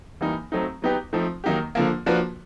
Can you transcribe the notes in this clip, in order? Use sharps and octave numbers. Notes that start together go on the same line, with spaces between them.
E3 G3 A#3 D#4
F#3 A3 C4 D#4
F#3 B3 D#4 G4 B4
F3 A3 C4 D#4
D#3 F#3 A#3 D#4 G4
D3 F3 A#3
F3 A#3 D4 F#4 B4